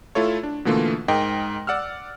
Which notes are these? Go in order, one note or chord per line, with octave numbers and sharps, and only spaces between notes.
A3 E4 F4 A4 C#5
D4
B2 D3 E3 A3 A#3 F4
G#2 A#4 D#5 G5
D5 F#5 E6 F6